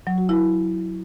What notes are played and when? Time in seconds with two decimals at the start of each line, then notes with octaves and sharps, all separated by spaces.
0.07 F#3
0.18 F#4
0.29 E4